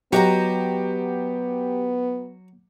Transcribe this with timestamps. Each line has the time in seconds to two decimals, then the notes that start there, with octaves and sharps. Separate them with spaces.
0.13 F#3 B3 F#4 G4 D#5 A#5